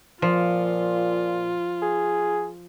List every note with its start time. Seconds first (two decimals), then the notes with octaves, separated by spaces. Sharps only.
0.22 A#2 F3 F4
1.82 G#4